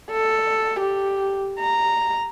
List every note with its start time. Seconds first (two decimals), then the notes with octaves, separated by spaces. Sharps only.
0.12 A4
0.80 G4
1.59 A#5